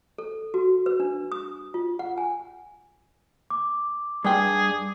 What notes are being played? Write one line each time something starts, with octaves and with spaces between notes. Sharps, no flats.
A4
F#4
B4
D4
D#6
F4
F#5
G#5
D6
G2 G#4 G5